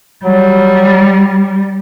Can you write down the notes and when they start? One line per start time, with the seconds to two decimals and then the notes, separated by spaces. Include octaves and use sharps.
0.24 F#3 G3